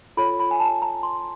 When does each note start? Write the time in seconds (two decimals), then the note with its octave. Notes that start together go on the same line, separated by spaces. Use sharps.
0.17 F4 A4 C#5 B5
0.39 B5
0.51 G#5
0.60 A5
0.82 A#5
1.03 C6